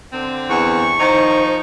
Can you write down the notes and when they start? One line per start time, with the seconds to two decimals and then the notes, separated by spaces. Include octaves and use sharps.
0.13 D3 C4
0.50 E2 C#6
1.00 D#3 F3 D#4 C5